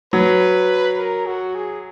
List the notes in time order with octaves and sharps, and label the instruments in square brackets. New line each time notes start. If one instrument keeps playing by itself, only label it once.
[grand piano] F#3 [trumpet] B4
[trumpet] A#4
F#4
G#4